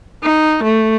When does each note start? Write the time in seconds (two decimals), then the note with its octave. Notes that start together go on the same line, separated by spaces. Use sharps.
0.24 D#4
0.63 A3